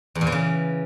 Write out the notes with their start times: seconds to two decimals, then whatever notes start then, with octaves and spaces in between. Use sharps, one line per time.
0.15 E2
0.21 A#2
0.27 E3
0.32 C#3